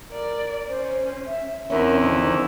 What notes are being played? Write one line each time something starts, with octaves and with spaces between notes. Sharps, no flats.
A#4 D5
C#4 C5
E5
E2 E3 C4 C#4 D#4 A#4 C5 E5
D3 D#3 F3 C5